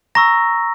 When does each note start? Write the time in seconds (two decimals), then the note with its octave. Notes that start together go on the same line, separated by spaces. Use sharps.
0.15 A#5 C#6 E6 A#6